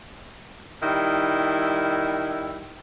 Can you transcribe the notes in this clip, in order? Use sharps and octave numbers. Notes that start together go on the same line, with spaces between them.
D#3 G3 E4